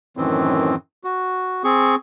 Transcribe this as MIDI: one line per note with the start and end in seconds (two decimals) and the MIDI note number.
0.17 0.75 42
0.17 0.75 45
0.17 0.75 51
0.17 0.75 52
0.17 0.75 60
1.04 1.63 66
1.64 1.95 60
1.64 1.95 68
1.64 1.95 85